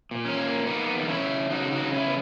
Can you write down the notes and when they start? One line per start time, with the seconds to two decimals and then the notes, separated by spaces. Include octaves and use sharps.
0.11 A#2
0.25 C#4
0.39 A#3
0.67 A#3 B3 D#4
0.96 E2
1.01 D#4
1.09 C#4 E4
1.23 C#3
1.51 C#3 D#4 F#4
1.72 D#4 F#4
1.79 C#3
1.93 C#4 E4
2.06 B3